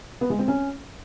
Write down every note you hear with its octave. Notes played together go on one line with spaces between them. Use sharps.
B3
G#3
C4
C#4